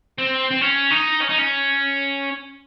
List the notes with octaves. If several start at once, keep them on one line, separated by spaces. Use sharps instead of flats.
C4
C4
C#4
D#4
C#4
D#4
C#4